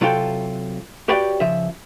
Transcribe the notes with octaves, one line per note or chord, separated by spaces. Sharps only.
C3 F#3 F4 F#4 A4 G5
F#4 G4 B4 C#5 D5 G5
C#3 F3 E5